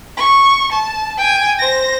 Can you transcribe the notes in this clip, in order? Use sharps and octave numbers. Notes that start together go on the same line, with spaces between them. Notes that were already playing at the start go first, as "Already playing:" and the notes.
C#6
A5
G5 G#5
C5 A#6